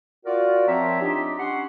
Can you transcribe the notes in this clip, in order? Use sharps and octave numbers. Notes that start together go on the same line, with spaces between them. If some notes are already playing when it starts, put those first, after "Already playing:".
F4 F#4 A#4 D5
F3 C4 C#5 E5 G5 A#5
D4 D#4 F4 G4
C#4 F#5 C6